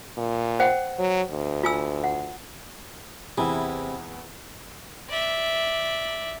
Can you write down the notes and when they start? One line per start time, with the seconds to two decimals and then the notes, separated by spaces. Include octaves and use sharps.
0.18 A#2
0.60 C5 F#5 G5
0.99 F#3
1.31 D2
1.64 F4 G#5 E6
2.04 F#5
3.38 E2 C3 E4 G#4 B5
5.09 D5 E5